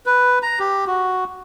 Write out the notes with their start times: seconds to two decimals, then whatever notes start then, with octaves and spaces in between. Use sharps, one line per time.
0.06 B4
0.43 A#5
0.59 G4
0.87 F#4